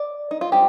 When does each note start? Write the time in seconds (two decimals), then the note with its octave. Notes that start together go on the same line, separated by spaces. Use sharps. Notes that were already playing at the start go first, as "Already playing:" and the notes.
Already playing: D5
0.31 D#4
0.41 F4
0.52 G3 C4 D#4 G4